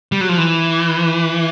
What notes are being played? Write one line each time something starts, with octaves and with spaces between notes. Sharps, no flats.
G3
F#3
F3
E3